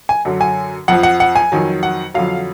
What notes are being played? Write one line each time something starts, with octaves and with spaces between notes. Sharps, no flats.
G#5
F#2 D3 F#3
G#5
F2 F3 F#5
F#5
F#5
G#5
F2 D#3 F#3
F#5
F2 D3 F#3 F5